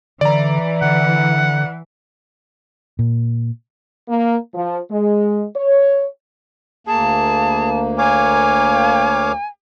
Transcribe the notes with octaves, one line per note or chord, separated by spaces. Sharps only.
D3 E3 D5 A#5
D3 F#5
A#2
A#3
F3
G#3
C#5
D2 A#3 G#4 A5
C#5 F5 G#5 D6